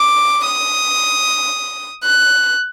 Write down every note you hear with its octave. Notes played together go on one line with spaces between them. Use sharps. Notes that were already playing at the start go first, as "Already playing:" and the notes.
Already playing: D6
D#6
F#6